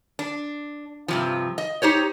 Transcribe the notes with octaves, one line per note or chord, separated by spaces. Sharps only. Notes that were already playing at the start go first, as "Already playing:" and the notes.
D4
G2 C3 F3
D#5
D#4 G4 C5 C#5